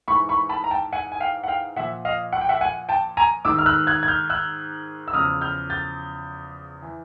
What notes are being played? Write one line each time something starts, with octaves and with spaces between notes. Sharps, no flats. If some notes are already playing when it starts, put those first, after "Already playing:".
G#2 E3 B5 C#6
B5 C#6
A5 B5
A#5
G5 A5
F#5 G#5
G#5
F5 G5
F#5
F5 G5
A#2 F3 E5 F#5
D#5 F5
F#5
G5
E5 F#5
F#5 G#5
G5 A5
G#5 A#5
G#2 D#3 D6 E6
F6
E6 F#6
F#6 G#6
G#6
F6 G6
E6 F#6
E6
E2 C#3 F3 D#6 F6
F6 G6
G6 A6
E3